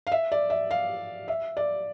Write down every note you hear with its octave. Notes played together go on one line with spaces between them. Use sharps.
F5
E5
D5
E5
F5
E5
D5